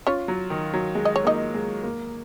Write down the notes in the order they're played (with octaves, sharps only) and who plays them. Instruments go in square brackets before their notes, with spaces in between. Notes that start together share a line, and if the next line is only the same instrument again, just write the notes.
[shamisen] C#4 C#5 [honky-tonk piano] F4
[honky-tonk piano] F#3
D#3
F#3
G#3
[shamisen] D#5
C#5
[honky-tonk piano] A#3 [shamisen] D#4 D#5
[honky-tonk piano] G#3
A#3